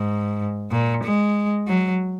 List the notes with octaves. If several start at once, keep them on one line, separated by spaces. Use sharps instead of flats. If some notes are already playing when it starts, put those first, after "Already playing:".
Already playing: G#2
A#2
G#3
F#3